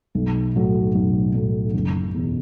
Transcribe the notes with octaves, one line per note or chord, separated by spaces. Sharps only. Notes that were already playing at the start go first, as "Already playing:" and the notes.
B1
A2 F#3 A3
B1
A2 F#3 A3
F#1
E2 B2